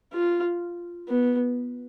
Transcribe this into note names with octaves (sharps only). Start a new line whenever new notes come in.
F4
B3